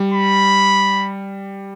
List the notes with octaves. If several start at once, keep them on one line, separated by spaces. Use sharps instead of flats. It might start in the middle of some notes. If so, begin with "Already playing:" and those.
Already playing: G3
B5